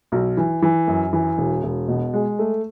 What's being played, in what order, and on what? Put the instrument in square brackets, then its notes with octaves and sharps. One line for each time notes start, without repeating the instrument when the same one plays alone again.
[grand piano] B1
E3
E3
F#2
E3
E1
E1
B2
G#3
A3